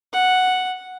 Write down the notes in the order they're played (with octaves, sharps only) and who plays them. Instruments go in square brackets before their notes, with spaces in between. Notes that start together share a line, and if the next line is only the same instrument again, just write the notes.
[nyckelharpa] F#5